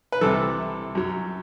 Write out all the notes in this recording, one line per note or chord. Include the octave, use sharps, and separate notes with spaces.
B4
C2 C3 E3 A4
F#2 F#3